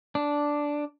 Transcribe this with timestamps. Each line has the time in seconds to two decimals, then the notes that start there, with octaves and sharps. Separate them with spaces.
0.15 D4